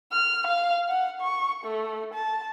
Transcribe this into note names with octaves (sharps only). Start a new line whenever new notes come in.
F6
F5
F#5
C#6
A3
A5